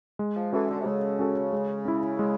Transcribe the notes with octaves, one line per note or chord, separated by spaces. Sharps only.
G#3
F3
E3 C#4 F#4 A4
D3
C3
C#3 G#3
C#4 F#4 A4
G#3
C#4 E4
G#3